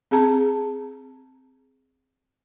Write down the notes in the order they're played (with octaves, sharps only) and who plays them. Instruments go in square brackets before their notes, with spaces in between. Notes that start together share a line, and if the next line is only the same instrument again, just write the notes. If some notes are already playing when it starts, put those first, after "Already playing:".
[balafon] C4 G#4 A5 A#5